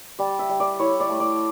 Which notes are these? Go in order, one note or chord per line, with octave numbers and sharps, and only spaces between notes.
G3 D5
E5
G3
D5
E4 C#5
D5
A3
D5